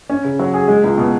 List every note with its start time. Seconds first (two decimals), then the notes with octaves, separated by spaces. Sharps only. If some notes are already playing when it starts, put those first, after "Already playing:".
0.10 C#4
0.24 C#3
0.39 F#3
0.54 G#4
0.68 G#3
0.84 C#2
0.98 B2